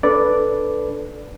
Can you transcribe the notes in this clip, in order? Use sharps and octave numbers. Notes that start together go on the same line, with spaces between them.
D4 A4 B4 D5